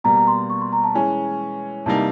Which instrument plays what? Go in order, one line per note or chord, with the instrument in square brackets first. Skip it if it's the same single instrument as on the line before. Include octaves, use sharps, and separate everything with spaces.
[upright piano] B2 G3 A#3 [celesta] A#5
[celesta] A#5
C6
C#6
C6
A#5
A5
[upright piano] E3 G#3 C#4 [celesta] G#5
[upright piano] C3 E3 G3 A#3 D#4 [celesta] A5